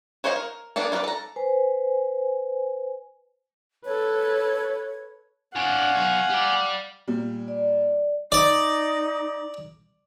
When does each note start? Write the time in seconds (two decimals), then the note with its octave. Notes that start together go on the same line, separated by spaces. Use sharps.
0.24 F#4 C5 C#5 D#5 F5
0.36 A#4
0.76 A#3 B3 D4 G#4 A4
0.92 F4 F#4 G#4 B4 D5
1.04 A4 A#5
1.36 B4 C5 G#5
3.85 A4 B4 C#5
5.56 D4 C#5 F5 F#5 G#5
5.94 B1 C#5
6.29 G4 D5
7.08 A#2 G3
7.48 D5
8.32 D#4 D5